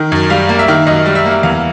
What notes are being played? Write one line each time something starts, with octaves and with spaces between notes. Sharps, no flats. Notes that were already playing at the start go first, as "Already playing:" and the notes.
Already playing: D#3
F#2
G3 F5
A#3
E5
D#3
F#2 D#5
G3
E5
A#3
E2 F5